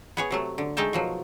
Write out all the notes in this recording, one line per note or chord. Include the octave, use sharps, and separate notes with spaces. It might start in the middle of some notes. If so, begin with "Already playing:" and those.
B3 G#4 C#5
C3 F#3 A3
D3
G#3 A3 D#4 G5 A5
B2 F3 F#3